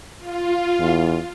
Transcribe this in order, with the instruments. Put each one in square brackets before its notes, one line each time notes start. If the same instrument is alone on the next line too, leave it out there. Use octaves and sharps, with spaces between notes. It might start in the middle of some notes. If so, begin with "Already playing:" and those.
[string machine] F4
[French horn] E2